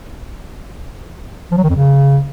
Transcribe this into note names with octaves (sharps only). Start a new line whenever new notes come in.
F3
F#3
D#3
F2
C#3